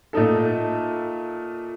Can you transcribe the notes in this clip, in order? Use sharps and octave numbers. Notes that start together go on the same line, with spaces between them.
A#2 A3 D#4 A4